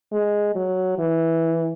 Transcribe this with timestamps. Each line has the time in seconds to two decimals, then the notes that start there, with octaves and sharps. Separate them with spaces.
0.12 G#3
0.55 F#3
0.99 E3